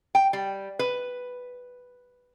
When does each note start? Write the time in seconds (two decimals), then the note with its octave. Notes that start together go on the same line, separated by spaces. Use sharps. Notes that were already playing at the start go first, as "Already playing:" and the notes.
0.15 G5
0.33 G3
0.79 B4